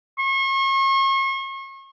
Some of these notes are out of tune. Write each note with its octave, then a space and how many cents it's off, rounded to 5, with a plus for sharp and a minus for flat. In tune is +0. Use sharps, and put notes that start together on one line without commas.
C#6 -40